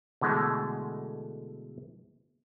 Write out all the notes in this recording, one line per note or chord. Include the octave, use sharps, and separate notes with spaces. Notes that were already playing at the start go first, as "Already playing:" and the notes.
B2 D3 E3 G#3 A3